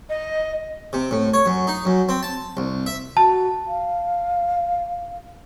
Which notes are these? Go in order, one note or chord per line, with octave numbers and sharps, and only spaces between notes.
D#5
C3
A2
C#5
F#2
D#4
F#2
C4
A5
C2
E5
F#4 A5
F5